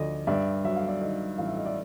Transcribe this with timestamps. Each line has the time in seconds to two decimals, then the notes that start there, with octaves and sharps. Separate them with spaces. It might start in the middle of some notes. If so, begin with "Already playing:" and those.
Already playing: D2 F3 D5 D#5
0.27 G2 D5 E5
0.64 F#3 E5
0.76 F5
0.88 D5 E5
1.01 D#3 D#5
1.38 A1 F5
1.48 E5
1.57 D#5
1.66 D5 E5